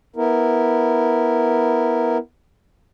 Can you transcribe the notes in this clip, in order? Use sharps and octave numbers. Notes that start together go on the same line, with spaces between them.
B3 E4 A#4